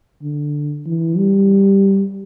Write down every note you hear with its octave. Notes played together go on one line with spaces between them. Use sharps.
D3
E3
G3